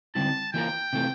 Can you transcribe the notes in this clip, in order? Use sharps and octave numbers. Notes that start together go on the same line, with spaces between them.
D3 G3 C4 E4 A5
E3 A#3 F4 A#4 G5
C3 E3 A3